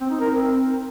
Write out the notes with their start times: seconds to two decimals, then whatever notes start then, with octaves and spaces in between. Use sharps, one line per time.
0.01 C4
0.10 D#4
0.20 A#4
0.30 C4